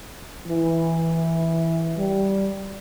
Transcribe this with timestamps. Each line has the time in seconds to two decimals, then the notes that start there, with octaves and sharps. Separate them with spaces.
0.47 E3
1.97 G3